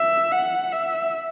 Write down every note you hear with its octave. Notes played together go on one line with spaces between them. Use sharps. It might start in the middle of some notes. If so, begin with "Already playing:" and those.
Already playing: E5
F#5
E5